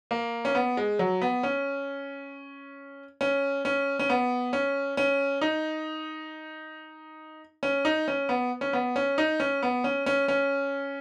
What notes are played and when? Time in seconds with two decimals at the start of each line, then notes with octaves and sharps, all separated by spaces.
0.11 A#3
0.45 C#4
0.55 B3
0.77 G#3
0.99 F#3
1.22 B3
1.43 C#4
3.21 C#4
3.65 C#4
3.99 C#4
4.09 B3
4.53 C#4
4.97 C#4
5.41 D#4
7.63 C#4
7.85 D#4
8.08 C#4
8.29 B3
8.61 C#4
8.73 B3
8.96 C#4
9.18 D#4
9.40 C#4
9.63 B3
9.84 C#4
10.06 C#4
10.28 C#4